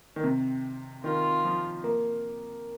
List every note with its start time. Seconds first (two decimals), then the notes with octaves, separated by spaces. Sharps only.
0.16 D#3
0.24 C3
1.04 D#3 F4
1.45 F3
1.84 A#3